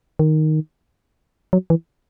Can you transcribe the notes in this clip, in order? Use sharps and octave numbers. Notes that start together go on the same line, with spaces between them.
D#3
F#3
E3